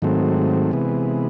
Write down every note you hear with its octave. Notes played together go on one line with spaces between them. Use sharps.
G#2 D#3 F#3 A3 C4
C3 E3 G#3 B3